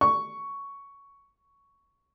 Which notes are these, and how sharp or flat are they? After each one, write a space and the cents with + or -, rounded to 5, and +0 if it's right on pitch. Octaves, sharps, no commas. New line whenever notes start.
C#6 +5